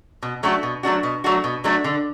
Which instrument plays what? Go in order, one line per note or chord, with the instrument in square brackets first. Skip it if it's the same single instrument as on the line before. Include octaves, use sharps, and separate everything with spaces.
[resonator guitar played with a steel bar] B2
F#3 A3 D4 F#4
B2
F#3 A3 D4 F#4
B2
F#3 A3 D4 F#4
B2
F#3 A3 D4 F#4
D3